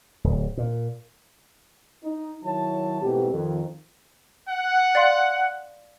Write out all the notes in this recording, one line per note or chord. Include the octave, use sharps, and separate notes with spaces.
D1
A#2
D#4
D#3 F#3 E4 C#5 A5
G#2 B2 E3 A3 C4 G4
F2 D#3
F#5
D5 F5 C6